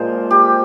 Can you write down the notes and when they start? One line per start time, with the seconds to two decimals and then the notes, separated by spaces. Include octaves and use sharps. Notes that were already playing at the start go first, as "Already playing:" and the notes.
Already playing: A#2 F3 G#3 A#4 C5
0.30 G4